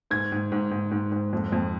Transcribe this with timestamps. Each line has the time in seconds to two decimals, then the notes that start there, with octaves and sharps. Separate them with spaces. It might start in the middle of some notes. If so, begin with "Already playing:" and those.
0.10 G#2 G#6
0.32 G#2
0.52 G#2
0.71 G#2
0.91 G#2
1.12 G#2
1.33 F2
1.52 F2